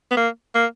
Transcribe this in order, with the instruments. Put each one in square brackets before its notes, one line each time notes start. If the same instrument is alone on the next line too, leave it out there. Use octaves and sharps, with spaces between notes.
[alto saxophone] B3
A#3
A#3